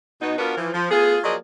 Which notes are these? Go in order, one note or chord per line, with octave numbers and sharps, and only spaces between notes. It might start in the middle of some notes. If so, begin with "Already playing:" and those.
B2 B3 D#4
B3 D4 F4 F#4 A#4 B4
E3 F3
F3
A3 B3 F4 G#4
F3 F#3 A#3 G#4 D5 D#5